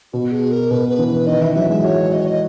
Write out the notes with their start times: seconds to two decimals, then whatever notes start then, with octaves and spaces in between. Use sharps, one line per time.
0.13 B2 F#4
0.32 G#4
0.51 A#4
0.71 B2 B4
0.90 B4
0.99 E3
1.08 B4
1.27 D#3 D#5
1.42 E3 E5
1.55 F#3 E5
1.70 G#3 E5
1.84 F#4 C#5
2.12 D#5
2.20 C#5
2.27 D#5